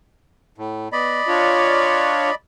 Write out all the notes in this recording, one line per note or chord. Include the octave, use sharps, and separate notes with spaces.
A2
B3 D5 D#5 B5
D4 F4 C#5